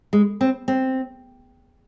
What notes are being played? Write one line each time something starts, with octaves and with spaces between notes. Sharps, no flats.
G#3
C4
C4